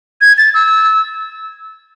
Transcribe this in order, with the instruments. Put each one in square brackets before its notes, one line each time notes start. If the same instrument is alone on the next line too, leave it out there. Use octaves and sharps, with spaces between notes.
[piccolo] G#6
A6
E6